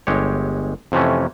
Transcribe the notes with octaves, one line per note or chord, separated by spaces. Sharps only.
G1 G#3 G4 C#5
F2 C3 E3 A3 C#4